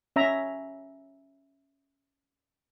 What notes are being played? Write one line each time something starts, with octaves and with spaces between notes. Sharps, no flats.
C#4 E5 A#5